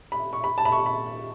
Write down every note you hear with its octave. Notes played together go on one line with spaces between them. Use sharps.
B5
C#6
B5
A5
B5
C#6
B5